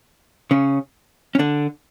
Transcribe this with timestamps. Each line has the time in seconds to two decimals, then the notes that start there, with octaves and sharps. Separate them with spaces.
0.51 C#3 C#4
1.35 C#4
1.39 D3 D4